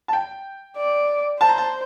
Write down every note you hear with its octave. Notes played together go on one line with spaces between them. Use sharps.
A5
G5
D5
C5 A5
A#5
A5